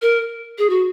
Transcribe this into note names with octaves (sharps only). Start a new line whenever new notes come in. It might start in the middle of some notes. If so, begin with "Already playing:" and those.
A#4
G#4
F#4